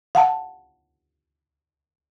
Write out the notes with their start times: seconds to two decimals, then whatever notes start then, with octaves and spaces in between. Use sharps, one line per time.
0.15 F5 F#5 A5